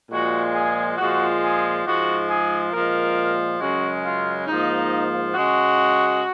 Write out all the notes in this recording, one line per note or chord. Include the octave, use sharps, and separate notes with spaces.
A#2 F3 G#3 F#4
G#4
A#2 F3 G#3 F#4
G#4
G#2 F3 G#3 F#4
G#4
A#2 F3 G#3 A#4
F#2 C#3 G#3 F#4
F4
G#2 F3 A#3 D#4
C#3 G#3 F#4